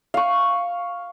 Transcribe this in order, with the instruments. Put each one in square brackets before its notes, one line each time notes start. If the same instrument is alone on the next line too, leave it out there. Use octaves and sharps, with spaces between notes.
[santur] F5 C#6